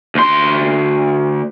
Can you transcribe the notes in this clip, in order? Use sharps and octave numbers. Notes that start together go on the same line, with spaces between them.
D2 C6